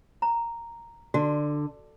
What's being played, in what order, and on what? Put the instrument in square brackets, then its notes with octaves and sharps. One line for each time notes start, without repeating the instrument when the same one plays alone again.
[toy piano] A#5
[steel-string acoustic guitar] D3 [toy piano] F#4